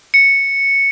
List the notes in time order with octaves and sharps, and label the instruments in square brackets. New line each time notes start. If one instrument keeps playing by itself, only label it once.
[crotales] C#7